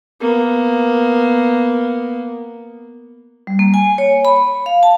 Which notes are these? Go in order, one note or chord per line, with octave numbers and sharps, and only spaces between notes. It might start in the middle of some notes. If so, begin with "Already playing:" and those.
A#3 B3
G3
A#3
G#5
C#5
B5
F5
A5